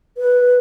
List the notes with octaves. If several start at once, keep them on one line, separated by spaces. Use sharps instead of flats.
B4